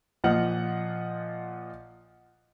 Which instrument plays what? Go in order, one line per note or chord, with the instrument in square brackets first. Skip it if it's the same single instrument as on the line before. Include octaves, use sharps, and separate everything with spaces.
[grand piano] A#2 F3 D#5 F#5 F6